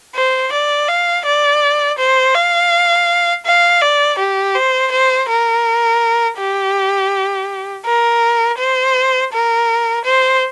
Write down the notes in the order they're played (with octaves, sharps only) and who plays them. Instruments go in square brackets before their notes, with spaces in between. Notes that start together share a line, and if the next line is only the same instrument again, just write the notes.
[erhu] C5
D5
F5
D5
C5
F5
F5
D5
G4
C5
C5
A#4
G4
A#4
C5
A#4
C5